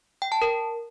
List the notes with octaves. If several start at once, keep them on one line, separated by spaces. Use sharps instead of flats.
G5
A5
A#4